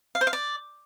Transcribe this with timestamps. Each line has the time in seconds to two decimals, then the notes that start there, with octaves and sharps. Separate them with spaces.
0.15 F5
0.21 C5
0.27 F5
0.33 D5